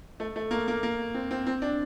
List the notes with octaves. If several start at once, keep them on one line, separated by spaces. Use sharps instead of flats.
A3
A3
A#3
A#3
A#3
C4
C4
C4
D4